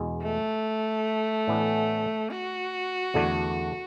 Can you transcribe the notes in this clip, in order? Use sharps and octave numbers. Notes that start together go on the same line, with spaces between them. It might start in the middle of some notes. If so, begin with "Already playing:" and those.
Already playing: E2 B2 G#3
A3
A2 E3 B3 D4
F#4
E2 D3 A3 D4